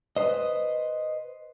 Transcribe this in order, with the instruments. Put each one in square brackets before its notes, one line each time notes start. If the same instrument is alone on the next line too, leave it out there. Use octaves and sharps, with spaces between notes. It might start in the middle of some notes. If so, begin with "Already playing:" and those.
[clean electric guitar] B4 C5 D#5